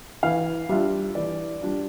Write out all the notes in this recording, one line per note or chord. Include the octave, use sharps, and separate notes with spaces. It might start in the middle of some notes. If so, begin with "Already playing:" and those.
E3 F5
G3 D4 F4 E5
E3 D5
G3 D4 F4